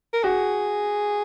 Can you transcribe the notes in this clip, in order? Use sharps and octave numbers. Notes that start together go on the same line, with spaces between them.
A#4
F#4 G#4